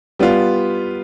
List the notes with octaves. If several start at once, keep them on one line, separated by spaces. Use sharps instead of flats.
G3 B3 F4